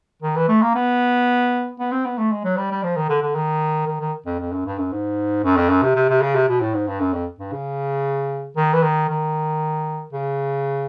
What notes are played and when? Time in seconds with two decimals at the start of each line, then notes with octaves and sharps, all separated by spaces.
0.23 D#3
0.36 E3
0.48 A3
0.62 A#3
0.75 B3
1.80 B3
1.92 C4
2.05 B3
2.18 A3
2.32 G#3
2.44 F#3
2.57 G3
2.71 G3
2.83 F3
2.96 D#3
3.09 D3
3.22 D3
3.35 D#3
3.87 D#3
4.01 D#3
4.26 F2
4.40 F2
4.52 F#2
4.66 G2
4.79 F#2
4.92 G#2
5.44 F#2
5.57 F2
5.69 F#2
5.83 C3
5.96 C3
6.09 C3
6.22 C#3
6.35 C3
6.48 B2
6.61 A2
6.74 G#2
6.87 G2
7.00 F#2
7.13 F2
7.39 G2
7.52 C#3
8.57 D#3
8.73 E3
8.83 D#3
9.09 D#3
10.13 C#3